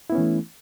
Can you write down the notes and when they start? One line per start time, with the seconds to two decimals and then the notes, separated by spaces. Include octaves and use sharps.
0.10 E4
0.12 B3
0.15 C#4
0.18 E3
0.20 A3